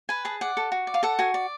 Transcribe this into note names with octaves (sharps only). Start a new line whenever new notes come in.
B4 G#5
G#4 A5
D5 F#5
A4
F#4
D5
F5
A4 F#5
F#4 G#5
D5